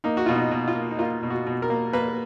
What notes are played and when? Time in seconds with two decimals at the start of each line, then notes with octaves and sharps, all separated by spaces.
0.04 A#3 D#4
0.17 F#4
0.26 B2 F4
0.35 D#4
0.51 B2
0.68 F4
0.75 A#3
0.91 D#4
0.99 A#3 F4
1.23 B2
1.30 F#4
1.46 B2
1.62 A#4
1.70 A#3
1.93 A#3 B4